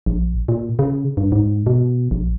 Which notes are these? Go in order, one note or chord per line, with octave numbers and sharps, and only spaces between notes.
A#1
A#2
C#3
G2
G#2
B2
A#1